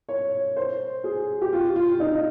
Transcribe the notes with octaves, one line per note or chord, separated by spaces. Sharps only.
C#5
C5
G#4
G4
F4
F4
D#4